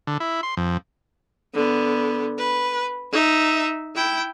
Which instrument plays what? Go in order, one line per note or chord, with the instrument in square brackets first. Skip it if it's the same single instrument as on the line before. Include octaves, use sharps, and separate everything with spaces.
[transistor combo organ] D3
E4
C6
F2
[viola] D3 B3
B4
D#4 E5
E4 G5